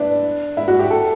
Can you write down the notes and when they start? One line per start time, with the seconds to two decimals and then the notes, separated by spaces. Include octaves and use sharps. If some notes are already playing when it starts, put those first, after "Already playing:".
Already playing: D4 E4 B4
0.57 E4
0.68 F#4
0.79 G4
0.90 A4